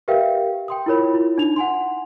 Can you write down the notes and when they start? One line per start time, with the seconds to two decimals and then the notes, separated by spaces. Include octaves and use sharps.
0.08 G4 A#4 B4 E5 F5 G5
0.68 G5 C6 D#6
0.86 E4 F4 A#4 C#5 B5
1.14 E4 F4
1.38 D4 D#4 F7
1.56 F#5 G#5 C6